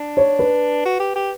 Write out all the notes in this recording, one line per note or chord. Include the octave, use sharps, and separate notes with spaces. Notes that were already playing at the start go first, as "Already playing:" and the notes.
Already playing: D4
C#5
B4
F#4
G4
G4